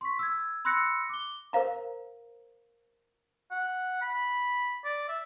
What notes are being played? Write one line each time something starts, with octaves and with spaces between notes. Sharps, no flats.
C6 C#6 B6
E6 G#6
B5 C6 E6 F#6 A#6 C#7
D6 G7
A#4 C5 F5 A#5
F#5
B5
D5
E5